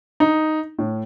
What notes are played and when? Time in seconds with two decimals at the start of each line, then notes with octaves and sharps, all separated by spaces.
0.20 D#4
0.79 A2